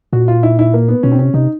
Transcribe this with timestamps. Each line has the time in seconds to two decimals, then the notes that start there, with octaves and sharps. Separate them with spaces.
0.13 A#2 F#4
0.28 F4
0.43 E4
0.59 E4
0.74 A#3
0.88 B3
1.03 B2 C#4
1.12 C4
1.19 C3 C#4
1.34 C3 D#4